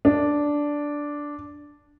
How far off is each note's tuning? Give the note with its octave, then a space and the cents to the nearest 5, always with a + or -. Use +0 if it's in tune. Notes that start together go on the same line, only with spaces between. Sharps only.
D4 -5